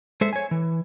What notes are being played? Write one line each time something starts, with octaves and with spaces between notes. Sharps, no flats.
G#3 A4 C5 E5
C#5 G#5
E3